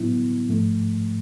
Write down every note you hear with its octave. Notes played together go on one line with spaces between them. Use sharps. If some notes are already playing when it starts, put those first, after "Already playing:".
Already playing: A2 F#3 B3 E4
G#2 F3 A3